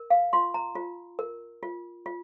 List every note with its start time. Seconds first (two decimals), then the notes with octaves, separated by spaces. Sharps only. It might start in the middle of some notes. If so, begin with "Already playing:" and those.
Already playing: A#4
0.10 F5
0.33 F4 C6
0.54 A#5
0.75 F4
1.19 A#4
1.63 F4
2.06 F4